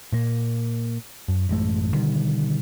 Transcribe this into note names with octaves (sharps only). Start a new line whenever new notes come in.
A#2 A#3
F#2
A1 F#2 G#3 A3
B2 D3 D#3 G3